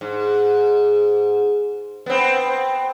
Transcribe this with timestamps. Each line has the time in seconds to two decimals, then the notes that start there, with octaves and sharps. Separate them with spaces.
0.01 G#2
2.06 B3 C4